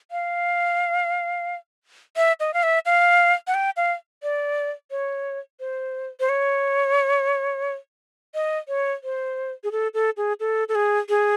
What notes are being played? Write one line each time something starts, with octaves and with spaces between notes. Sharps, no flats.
F5
E5
D#5
F5
E5
F5
F#5
G5
F5
D5
C#5
C5
C5
C#5
D#5
C#5
C5
G#4
A4
A4
G#4
A4
A4
G#4
G#4